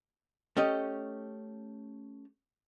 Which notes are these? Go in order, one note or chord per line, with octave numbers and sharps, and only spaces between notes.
A3 C#4 G4 D#5